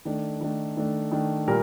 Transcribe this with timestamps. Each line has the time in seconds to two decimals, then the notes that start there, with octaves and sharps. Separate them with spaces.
0.05 D#3 A3 D4
0.41 D#3 A3 D4
0.77 D#3 A3 D4
1.11 D#3 A3 D4
1.48 A#2 G3 A#4